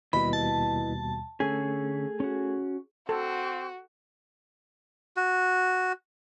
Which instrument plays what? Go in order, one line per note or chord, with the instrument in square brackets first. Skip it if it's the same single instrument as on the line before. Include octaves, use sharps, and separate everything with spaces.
[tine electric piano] D#2 B2 G3 [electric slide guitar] E4 B4 D#5 [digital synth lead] B5
[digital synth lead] A5
[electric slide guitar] D3 C#4 [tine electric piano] A3 A4 [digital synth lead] G#4
[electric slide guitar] C#4 F#4
[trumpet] C4 [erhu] F#4 [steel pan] A4
[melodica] F#4